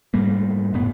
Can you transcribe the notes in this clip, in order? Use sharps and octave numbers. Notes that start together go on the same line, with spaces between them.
G#2 G3 A3 A#3
F#1 F#2 A2 B3